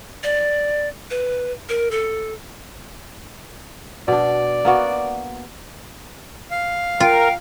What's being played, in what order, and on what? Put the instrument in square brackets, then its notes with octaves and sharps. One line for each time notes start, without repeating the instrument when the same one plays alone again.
[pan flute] D5
B4
A#4
A4
[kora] B2 D4 [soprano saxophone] D5
[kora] A#3 B3 F#4
[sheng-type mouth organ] F5
[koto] F4 [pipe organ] A#4 [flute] G5